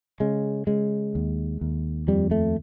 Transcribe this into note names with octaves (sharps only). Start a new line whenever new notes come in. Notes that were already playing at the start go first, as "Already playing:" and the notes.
C#3 G#3
C#3 G#3
D#2
D#2
F2 G3
A3